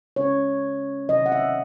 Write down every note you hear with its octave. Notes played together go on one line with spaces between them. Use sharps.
C#3 G#3 C#4 C#5
C3 D#3 F#3 D#5
F#5
E5